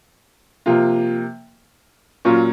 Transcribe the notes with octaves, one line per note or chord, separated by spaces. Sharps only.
C3 F3 A#3 F4
A#2 F#3 C#4 F4